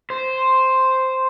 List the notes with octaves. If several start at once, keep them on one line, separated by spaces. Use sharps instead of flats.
C5